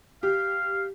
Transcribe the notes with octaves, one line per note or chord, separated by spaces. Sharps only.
G4 F5